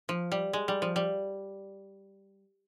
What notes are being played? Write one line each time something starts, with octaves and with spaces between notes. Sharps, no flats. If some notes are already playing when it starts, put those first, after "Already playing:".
F3
G3
G#3
G3
F3
G3